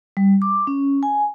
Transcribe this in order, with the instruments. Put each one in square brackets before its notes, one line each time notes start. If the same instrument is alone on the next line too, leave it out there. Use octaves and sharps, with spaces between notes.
[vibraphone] G3
D6
C#4
G#5